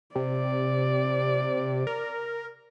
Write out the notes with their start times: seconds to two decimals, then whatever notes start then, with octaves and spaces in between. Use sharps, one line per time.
0.15 C3 D5
1.87 A#4